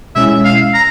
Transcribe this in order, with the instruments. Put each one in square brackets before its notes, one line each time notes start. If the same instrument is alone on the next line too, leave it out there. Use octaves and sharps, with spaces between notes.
[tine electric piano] B2 G#3 C#4 E4 [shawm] E5
[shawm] F5
A#5